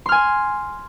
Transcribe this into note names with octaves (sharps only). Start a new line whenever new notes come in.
G#5 C6 F6